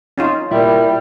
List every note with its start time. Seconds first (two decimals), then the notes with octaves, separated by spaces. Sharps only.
0.18 C#4 D#4 F4
0.51 A#2 G3 E4